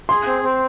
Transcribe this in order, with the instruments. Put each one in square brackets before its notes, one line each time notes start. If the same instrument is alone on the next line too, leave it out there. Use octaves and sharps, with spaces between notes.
[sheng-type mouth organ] G#4 [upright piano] C6
[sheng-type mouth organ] C4
C4